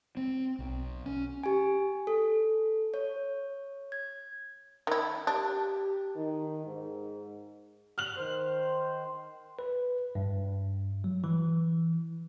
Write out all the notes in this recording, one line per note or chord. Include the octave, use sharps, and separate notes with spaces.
C4
B1
C#4
G4 G#5
A4
C#5
G#6
D#3 E4
D4 G4
D#3
G#2
F6 F#6 F#7
D#3 C5
B4
G2
F#3
E3